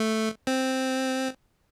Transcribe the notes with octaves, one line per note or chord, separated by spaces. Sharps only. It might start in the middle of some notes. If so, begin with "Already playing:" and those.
Already playing: A3
C4